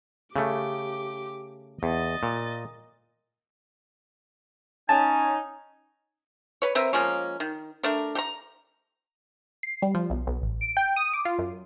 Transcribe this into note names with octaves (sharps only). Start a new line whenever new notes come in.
C#3 A3 G4 D6
E2 D#5 A6
A#2
C#4 D#4 G#5 A5
B4 C#5
C4 A#4 B4 E5
F3 G#3 A#3 C#4
D#3
A3 D4 A#4
G4 A#5
C7
G3
F3
B1
B1
A1
D7
G5
D#6
D6
F4
F#2